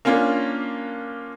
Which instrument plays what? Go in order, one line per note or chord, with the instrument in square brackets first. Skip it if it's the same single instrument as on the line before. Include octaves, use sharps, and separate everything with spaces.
[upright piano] A#3 C#4 D4 F4